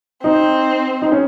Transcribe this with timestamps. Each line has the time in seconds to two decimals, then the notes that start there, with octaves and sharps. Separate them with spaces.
0.24 C4 D#4
1.02 D#4
1.12 C#4